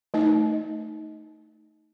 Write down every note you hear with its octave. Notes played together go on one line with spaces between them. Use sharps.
A3 D#4